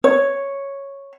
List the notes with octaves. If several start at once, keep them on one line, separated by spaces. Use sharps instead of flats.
C#5